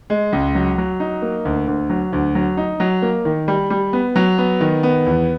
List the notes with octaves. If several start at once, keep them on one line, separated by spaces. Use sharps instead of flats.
G#3
C#2
F#3
F#3
D#4
A#3
D2
D2
F#3
D2
F#3
D#4
F#3
A#3
D#3
G3
G3
B3
F#3
B3
D#3
B3
E2